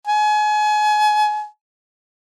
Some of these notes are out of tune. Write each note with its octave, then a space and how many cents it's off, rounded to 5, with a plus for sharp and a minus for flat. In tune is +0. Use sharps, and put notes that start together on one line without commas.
G#5 +30